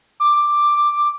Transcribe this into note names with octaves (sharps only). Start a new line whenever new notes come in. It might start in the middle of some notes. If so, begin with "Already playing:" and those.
D6